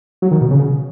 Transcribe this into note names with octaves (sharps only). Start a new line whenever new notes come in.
F#3
D#3
B2
C#3